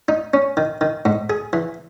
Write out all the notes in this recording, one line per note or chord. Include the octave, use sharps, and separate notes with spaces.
D#4
C#4
D#3
D#3
G#2
G#4
E3